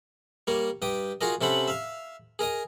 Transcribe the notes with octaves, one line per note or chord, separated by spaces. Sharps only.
G3 A#3 A#4 C#5
G2 G4 G5 D#6
F4 F#4 G#4 A#4 D#5
C3 C#4 A4 C5 F#5 B5
E5 F5
G#4 A#4 D#5 D#6